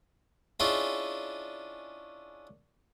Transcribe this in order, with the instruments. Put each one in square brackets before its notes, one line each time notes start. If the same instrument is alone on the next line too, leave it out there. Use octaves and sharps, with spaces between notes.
[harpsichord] C#4 D4 E4 F4 G#4 D#5